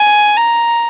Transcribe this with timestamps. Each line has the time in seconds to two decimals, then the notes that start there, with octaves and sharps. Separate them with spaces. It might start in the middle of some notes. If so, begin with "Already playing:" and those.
Already playing: G#5
0.37 A#5